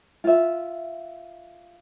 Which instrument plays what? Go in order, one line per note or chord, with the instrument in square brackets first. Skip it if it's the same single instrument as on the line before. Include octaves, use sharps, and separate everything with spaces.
[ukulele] F4 E5